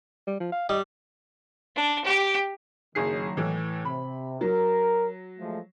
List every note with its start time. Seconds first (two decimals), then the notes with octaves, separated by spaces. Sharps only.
0.28 G3
0.40 F3
0.52 F5
0.69 G3 D#5
1.76 D4
2.04 G4
2.95 F#1 D#3 F#3 G#4 C7
3.37 A2 E3
3.85 C3 B5
4.41 F#3 A#4
5.39 F3 G#3 A3